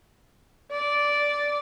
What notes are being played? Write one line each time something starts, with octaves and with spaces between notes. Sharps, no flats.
D5